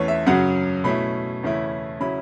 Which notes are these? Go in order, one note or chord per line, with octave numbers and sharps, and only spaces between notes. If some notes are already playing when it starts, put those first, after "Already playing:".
Already playing: E2 E3 A3 C#4 C#5
E5
F#2 C#3 F#3 F#5
B2 A3 C#4 E4 B5
E2 C#3 A3 C#4 E4
C#3 F#3 C#4 E4 B5